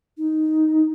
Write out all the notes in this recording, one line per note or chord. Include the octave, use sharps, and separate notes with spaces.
D#4